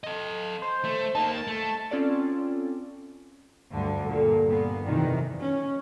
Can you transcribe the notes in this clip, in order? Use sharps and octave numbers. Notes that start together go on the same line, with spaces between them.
A4 D#5
C5
A3
A#3 D#4 A5
A3
C4 C#4 F4 A4 D5
D2 G2 D3
G2 A#2 A#3 A4
A#2 B3
F2 C3 D#3 E3 D5
C#4